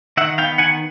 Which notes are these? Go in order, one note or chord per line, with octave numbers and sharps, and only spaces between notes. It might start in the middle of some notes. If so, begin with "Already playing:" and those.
D#3 E5 F#5
B3 F5 G5
D#3 F#5 G#5